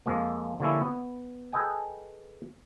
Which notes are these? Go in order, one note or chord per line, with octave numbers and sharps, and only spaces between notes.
F2 F3 G#3 A#3
D3 F3 G3 A#3 C#4 E4
B3
G#4 A4 B4 D#5 G5 G#5